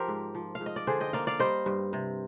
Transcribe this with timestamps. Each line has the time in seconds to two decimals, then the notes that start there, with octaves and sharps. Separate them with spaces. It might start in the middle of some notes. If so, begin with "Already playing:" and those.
Already playing: F3 G4 A#4 C5
0.08 G#2
0.35 F3
0.55 F5
0.61 G#2
0.66 D#5
0.76 D5
0.87 D3 G#4 C5
1.00 D#5 G5
1.13 A#3 D5 F5
1.27 D5 F5
1.39 G3 C5 D#5
1.66 G2
1.93 C3